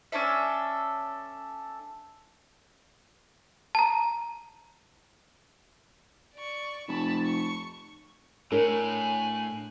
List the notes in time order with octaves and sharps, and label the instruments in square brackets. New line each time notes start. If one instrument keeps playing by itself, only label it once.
[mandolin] C#4 D4 A4 E5
[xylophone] A5 A#5
[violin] D5 C#6
[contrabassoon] F1 [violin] A5 B5
[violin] C#6
[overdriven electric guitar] A2 [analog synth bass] D4 [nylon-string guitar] A#4 C#5 [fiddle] G#5 F#6